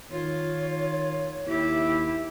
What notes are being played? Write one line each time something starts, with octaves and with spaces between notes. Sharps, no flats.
D#3 F4 C#5
D#2 E4 G4